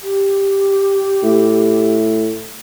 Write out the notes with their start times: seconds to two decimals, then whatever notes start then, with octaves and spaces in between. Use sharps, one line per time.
0.01 G4
1.23 A2